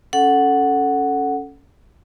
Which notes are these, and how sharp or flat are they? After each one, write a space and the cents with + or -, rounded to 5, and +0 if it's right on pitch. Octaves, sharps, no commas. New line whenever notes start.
C#4 +0 A4 +0 F#5 +0